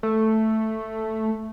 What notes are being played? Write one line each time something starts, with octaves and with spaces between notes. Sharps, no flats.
A3